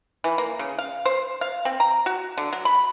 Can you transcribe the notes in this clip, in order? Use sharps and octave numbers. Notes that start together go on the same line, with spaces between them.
E3
A#3
C#3
F5
C5
F5
C4
A#5
F#4
D3
F#3
B5